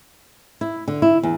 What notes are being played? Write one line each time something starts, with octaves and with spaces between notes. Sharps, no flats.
E4
D3
E4
E2